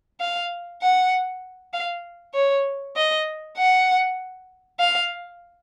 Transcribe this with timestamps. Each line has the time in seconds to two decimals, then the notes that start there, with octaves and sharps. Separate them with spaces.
0.20 F5
0.82 F#5
1.73 F5
2.35 C#5
2.96 D#5
3.57 F#5
4.80 F5